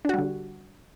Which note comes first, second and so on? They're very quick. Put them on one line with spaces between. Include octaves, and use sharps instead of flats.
D4 F#4 G3 D3